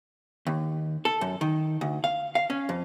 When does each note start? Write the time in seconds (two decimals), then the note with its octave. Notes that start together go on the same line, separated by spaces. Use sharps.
0.47 D#2
1.05 A4
1.21 F#2
1.41 D#3
1.81 D2
2.04 F5
2.35 F5
2.50 C#4
2.69 F2